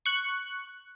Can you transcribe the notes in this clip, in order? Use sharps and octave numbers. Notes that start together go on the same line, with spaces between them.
C#6 F#6